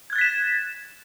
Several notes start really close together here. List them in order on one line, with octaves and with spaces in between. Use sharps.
G#6 F#6 A6 B6 E7